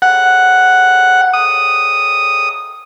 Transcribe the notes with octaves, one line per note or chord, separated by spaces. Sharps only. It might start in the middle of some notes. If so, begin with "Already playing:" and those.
F#5
D#6